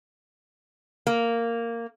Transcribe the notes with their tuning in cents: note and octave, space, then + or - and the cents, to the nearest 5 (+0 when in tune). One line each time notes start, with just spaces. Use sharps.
A#3 -10